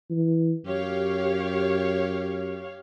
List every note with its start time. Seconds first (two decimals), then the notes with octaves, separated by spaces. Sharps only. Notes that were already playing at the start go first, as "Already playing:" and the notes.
0.10 E3
0.65 F#2 G4 C#5 F5